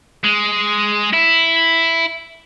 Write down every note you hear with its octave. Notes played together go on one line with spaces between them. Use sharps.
G#3
E4